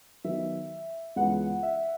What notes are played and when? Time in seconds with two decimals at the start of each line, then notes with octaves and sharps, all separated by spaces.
0.24 D#3 F#3 B3 E5
1.16 C#2 C#3 E3 G#3 B3 F#5
1.63 E5